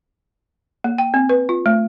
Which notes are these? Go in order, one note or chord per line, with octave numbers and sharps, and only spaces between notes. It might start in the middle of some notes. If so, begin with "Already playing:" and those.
A#3
G5
C4
B4
F4
A3